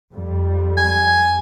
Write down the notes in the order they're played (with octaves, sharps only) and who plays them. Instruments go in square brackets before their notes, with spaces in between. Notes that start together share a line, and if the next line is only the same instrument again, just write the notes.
[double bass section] F2 G3
[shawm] G#5